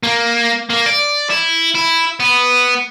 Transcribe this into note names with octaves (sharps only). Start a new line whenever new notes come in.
A#3
A#3
D5
E4
E4
B3